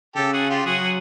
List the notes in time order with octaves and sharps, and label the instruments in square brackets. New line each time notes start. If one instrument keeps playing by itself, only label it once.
[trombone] C#3 [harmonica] G4 A4
[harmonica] F#4 G#4
F4 G4
[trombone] F#3 [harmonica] F#4 G#4
[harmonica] G#4